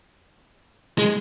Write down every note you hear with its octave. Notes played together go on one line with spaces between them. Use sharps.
G#3